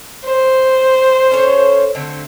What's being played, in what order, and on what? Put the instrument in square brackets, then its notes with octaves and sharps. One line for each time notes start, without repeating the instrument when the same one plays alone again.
[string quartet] C5
[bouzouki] C#4 A4 C#5
D3 A3 C4